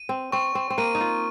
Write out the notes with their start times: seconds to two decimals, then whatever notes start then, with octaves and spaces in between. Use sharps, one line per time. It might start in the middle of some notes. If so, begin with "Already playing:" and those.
Already playing: D#7
0.09 C4
0.32 C4 C#6
0.55 C4
0.70 C4
0.78 A#3 D#7
0.95 D#4
1.01 F4